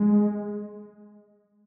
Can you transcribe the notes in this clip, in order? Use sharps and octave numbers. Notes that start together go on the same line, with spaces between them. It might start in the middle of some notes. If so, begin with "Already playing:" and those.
Already playing: G#3